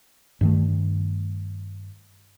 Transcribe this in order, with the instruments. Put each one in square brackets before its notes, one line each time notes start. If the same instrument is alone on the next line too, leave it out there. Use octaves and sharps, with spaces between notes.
[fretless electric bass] G2 D#3 A3